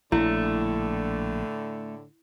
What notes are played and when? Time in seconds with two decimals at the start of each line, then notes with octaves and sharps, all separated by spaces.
0.12 A#1 A2 D3 A3 E4